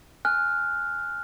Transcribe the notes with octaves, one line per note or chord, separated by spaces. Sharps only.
G#5 F6 F#6